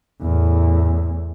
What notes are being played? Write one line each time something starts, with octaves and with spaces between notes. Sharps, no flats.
E2 A2